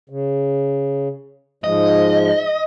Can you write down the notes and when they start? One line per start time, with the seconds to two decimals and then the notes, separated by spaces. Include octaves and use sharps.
0.10 C#3
1.64 G#2 F3 G#3 D#5